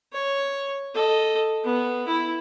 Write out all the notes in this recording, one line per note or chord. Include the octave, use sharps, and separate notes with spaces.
C#5
A4 D#5
B3
E4